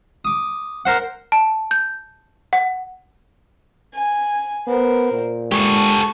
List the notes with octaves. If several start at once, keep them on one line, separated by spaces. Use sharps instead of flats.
D6 D#6
A#4 C5 F#5
A5
G6
F#5
G#5
B3 A#4 C5
A#2
G#3 G4 A4 A5 C#6